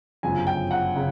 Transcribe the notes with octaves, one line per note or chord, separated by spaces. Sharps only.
G1 F#2 C#3 F3 G#5
G5
F#5
C#3